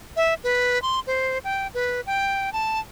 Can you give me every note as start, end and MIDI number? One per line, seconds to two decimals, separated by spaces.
0.17 0.34 76
0.44 0.81 71
0.82 1.00 84
1.07 1.38 72
1.44 1.67 79
1.74 2.01 71
2.07 2.52 79
2.53 2.80 81